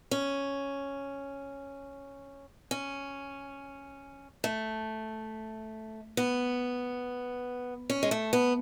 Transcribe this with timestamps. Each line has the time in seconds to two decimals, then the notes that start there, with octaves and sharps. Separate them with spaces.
0.11 C#4
2.71 C#4
4.44 A3
6.17 B3
7.90 C#4
8.03 G#3
8.11 A3
8.33 B3